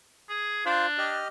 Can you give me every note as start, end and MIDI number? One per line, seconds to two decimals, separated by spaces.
0.29 0.62 68
0.66 1.18 62
0.66 0.86 65
0.66 0.86 72
0.66 0.86 77
0.98 1.28 67
0.98 1.28 75
0.98 1.28 89